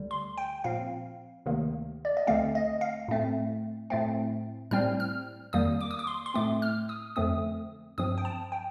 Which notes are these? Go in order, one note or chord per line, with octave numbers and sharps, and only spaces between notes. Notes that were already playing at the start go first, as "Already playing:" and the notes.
Already playing: D2 D3 G3
C6
G5
A#2 F3 C4 F5
D2 C3 D#3 A#3
D5
D#5
D2 D3 A3 C4 F5
D#5
F5
A2 A3 C4
A2 A3 C4
A2 G3 C4 F6
F6
F2 D#3 G3 A#3 D#6
D6
D#6
D6
C6
C6
A2 A3 C4 D6
F6
D#6
F2 D3 F3 A3 C4 D#6
G2 F3 C4 D#6
G5
A5
G5